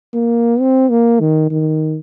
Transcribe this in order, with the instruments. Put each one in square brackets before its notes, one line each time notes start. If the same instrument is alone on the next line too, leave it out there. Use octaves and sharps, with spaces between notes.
[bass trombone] A#3
C4
A#3
D#3
D#3